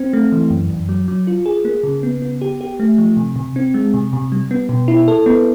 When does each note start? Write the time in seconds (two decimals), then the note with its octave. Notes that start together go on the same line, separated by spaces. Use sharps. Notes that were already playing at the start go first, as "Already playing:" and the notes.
Already playing: C4
0.13 A3
0.32 E3
0.50 F#2
0.70 F#2
0.89 F#3
1.08 F#3
1.27 F4
1.46 G#4
1.65 A#3
1.83 C#3
2.03 B3
2.22 B3
2.41 G4
2.61 G4
2.80 A3
2.98 F3
3.17 C3
3.36 C3
3.56 C4
3.74 G#3
3.94 C3
4.13 C3
4.32 G3
4.51 B3
4.69 B2
4.88 E4
5.08 A4
5.26 B3